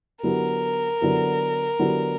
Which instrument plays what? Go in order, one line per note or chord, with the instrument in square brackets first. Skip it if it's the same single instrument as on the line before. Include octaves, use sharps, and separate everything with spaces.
[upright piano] D3 F#3 B3 E4 G4 [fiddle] A#4
[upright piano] D3 F#3 B3 E4 G4
D3 F#3 B3 E4 G4